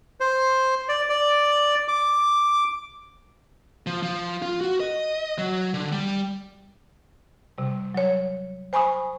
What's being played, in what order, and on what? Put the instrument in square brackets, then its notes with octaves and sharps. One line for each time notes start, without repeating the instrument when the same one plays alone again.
[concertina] C5
D5
D5
D6
[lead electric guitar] F3
F3
F4
F#4
D#5
F#3
D3
G3
[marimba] C3 G3
F#3 C#5
C5 G#5 B5 C#6 D#6